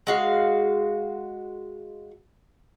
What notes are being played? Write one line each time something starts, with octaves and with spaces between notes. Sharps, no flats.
G#3 F#4 F5